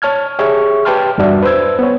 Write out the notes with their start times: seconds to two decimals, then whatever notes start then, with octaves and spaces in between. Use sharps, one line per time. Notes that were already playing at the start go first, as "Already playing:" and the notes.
0.02 C#5 A5 F6 G#6
0.39 G4 G#4 C#5 E5 C#6
0.85 G4 B4 G5 A5 C6 F6
1.18 E2 G2 G3 D4 F#4 E5
1.43 B4 C5 E6 G#6
1.79 B3 C#5